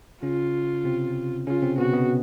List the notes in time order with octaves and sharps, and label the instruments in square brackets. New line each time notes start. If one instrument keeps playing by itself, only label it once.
[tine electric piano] C#3 C#4 [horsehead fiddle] F4
[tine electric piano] C3 C4
[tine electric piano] C#3 C#4 [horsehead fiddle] F4
[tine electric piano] C3 C4
[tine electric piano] B2 B3 [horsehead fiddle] F#4
[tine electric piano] B2 B3